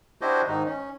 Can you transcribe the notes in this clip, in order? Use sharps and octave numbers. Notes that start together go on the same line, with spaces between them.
D4 E4 F#4 G4 C5 D#5
G#2 D#3 D#4
C#4